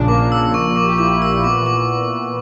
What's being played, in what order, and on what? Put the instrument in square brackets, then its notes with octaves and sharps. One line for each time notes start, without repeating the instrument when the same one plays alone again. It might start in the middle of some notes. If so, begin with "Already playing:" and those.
Already playing: [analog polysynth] A#1 A#2 C#3 D4
[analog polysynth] A#3 [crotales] D6
[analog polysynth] A#2
[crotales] E6
[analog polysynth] A#1
[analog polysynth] A#3 [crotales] C#6
[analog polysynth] A#2
[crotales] D6
[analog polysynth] G4
[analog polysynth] E4 [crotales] D6
[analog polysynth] A#3
[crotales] E6
[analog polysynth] A#2
[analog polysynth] B3 [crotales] D6
[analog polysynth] E3
[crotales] D6